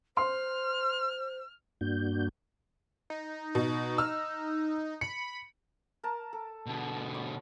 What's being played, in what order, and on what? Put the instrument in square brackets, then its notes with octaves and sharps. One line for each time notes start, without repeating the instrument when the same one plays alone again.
[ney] C5 [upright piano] C6 [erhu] F6
[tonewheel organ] G2 A#3 D4 F#4 G6
[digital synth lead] D#4
[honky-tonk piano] B2
E6 F6
[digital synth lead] B5 [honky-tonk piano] C#7
[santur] A#4 A5
A4
[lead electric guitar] B2 D3
[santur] C#5 B5 D6